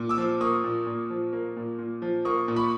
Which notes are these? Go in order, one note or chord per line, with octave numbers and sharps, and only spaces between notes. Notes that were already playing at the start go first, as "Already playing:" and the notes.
Already playing: A#2
D6 E6
F3
A#3 C#6 D#6
A#2
A#2
F3
A#3
A#2
A#2
F3
A#3 C#6 D#6
A#2
B5 C#6